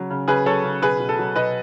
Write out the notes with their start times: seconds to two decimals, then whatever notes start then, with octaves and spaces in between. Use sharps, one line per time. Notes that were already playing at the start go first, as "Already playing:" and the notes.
Already playing: C#3 F#3
0.10 C#3
0.28 C#3 G#4 B4
0.45 F#3 A4 C#5
0.64 C#3
0.82 B2 G#4 B4
0.99 B2
1.09 A4
1.18 F#3
1.36 B2 B4 D#5